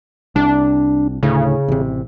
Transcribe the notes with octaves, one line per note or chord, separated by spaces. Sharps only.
C2 D4
D2 A2 C#3
A1 C3